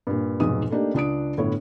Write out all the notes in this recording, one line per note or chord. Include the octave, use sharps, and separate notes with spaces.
G2 A#2
F1 B1 G#2 D#6
A3 A#3 D4 D#4 G4
C#2 D4 D#6 D7
G1 A2 B3 C#5